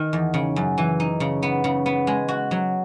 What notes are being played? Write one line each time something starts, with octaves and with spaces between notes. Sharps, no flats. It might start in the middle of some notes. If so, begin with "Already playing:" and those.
Already playing: D#3
E2
C#3
F#2
E3
D#4
C#3
B3
C#3
B3
G#3
F#4
F#3